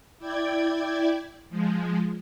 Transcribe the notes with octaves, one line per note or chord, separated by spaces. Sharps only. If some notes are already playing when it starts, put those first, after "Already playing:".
E4 D5 G5 G#6
F3 G#3